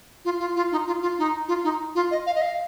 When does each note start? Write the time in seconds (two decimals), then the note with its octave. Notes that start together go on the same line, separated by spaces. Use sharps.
0.25 F4
0.40 F4
0.56 F4
0.72 D#4
0.87 F4
1.02 F4
1.18 D#4
1.48 F4
1.64 D#4
1.95 F4
2.11 D#5
2.26 F5
2.35 D#5
2.42 F5